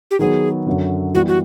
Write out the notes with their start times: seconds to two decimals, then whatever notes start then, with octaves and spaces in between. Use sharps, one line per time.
0.11 G4
0.19 D#3 F#3 B3 G#4
0.67 F#2 D3 F#3
1.14 E3 G3 B3 F#4
1.28 F#4